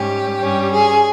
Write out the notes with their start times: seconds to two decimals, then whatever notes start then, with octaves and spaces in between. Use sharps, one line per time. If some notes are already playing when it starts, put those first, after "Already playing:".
Already playing: G#2 G3 C#4 G4
0.40 G2 G3 C#4
0.72 G#4